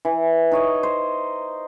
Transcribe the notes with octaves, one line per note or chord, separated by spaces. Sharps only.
E3
D#4 C#5 D#5
C5